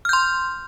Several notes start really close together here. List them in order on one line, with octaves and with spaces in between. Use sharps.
F6 G6 C6